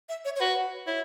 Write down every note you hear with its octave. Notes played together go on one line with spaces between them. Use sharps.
E5
C#5
C#5
F#4 B4
E4 C#5